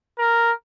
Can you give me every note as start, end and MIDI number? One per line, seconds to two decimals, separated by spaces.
0.18 0.52 70